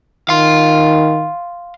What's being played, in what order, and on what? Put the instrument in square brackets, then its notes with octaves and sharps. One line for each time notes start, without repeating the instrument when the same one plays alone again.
[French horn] D#3 [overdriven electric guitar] F5 C6